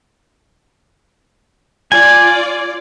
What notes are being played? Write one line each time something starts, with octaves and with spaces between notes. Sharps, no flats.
F4 D5 G#5